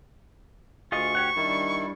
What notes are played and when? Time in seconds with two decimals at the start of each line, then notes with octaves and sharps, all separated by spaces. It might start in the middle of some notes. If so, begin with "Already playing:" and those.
0.92 D2 F4 G#4 D#5 C#6
1.15 G4 C#5 F#5
1.36 D#3 G3 D4 E4